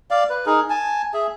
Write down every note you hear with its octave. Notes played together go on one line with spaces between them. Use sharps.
D5 F5
B4
D#4 G#4 A#4
G#5 A5
G#4 E5